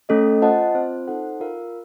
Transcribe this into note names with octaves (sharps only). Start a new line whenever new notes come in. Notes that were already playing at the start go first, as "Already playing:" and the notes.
A3 C#4 A4 D#5
F4 C5 D#5 F#5 A5
C4 F4 C5
D#4 A4 C5 F#5
F4 A#4 F5